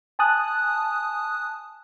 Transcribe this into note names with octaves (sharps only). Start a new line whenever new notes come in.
G#5 A5 D#6 F#6